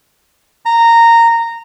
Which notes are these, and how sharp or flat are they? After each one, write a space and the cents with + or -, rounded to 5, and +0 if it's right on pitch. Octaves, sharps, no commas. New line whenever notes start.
A#5 -15